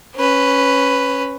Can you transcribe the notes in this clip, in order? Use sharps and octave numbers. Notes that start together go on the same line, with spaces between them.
C#4 B4